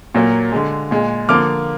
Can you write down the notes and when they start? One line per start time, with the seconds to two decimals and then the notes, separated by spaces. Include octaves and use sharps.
0.15 A#2 F#3 A#3
0.52 D3 G#3
0.91 A#2 G#3
1.29 D3 F3 A#3 D6 F6